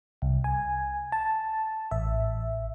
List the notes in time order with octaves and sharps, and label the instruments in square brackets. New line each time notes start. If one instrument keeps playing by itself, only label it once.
[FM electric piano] C2
G#5
A5
A1 E5